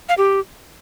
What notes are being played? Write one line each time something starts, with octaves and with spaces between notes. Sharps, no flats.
F5
G4